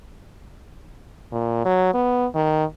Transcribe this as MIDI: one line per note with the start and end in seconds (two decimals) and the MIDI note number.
1.32 1.62 46
1.65 1.91 54
1.94 2.27 59
2.35 2.64 51